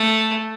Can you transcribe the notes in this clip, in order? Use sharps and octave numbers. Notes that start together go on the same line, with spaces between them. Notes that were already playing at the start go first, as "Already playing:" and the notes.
Already playing: A3